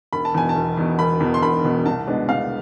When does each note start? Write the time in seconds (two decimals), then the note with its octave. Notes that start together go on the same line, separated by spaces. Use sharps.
0.12 E1 B5
0.25 A5
0.34 E2 B2 G#5
0.49 A5
0.55 E1
0.77 E2 B2
0.99 E1 B5
1.20 E2 B2
1.34 C6
1.42 E1 B5
1.64 E2 B2
1.85 C2 A5
2.07 B2 G#3 B3 D4
2.29 C2 F5